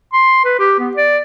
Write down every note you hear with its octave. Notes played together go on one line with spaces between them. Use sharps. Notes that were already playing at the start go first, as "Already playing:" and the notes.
C6
B4
G4
B3
D5